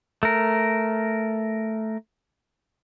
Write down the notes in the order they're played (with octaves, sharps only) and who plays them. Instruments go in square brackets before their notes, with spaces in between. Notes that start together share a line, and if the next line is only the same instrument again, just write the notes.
[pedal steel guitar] A3 A#4